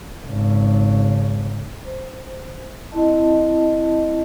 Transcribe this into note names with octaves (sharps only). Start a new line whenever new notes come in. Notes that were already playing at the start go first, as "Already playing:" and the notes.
G#1 C#3
C5
C4 E4 D#5 A5